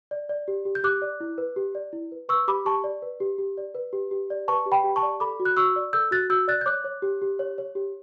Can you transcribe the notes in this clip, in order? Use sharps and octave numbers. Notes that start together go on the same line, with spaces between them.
D5
D5
G4
G4
G6
G4 D6 F#6
D5
E4
B4
G4
D5
E4
B4
B4 C#6 E6
G4 B5 D6
G4 A5 C#6
D5
B4
G4
G4
D5
B4
G4
G4
D5
B4 A5 C#6
G4
G5 B5
G4
A5 C#6
D5
A4 B5 D6
F#4
F#6
F#4 C#6 E6
D5
A4 E6 G6
F#4 F#6 A6
F#4 E6 G6
D5 F#6 A6
G6
C#5 D6 F#6
C#5
G4
G4
C#5
C#5
G4